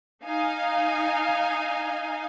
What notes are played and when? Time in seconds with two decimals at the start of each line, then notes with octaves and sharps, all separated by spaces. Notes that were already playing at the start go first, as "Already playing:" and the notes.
0.24 D#4 F5 G#5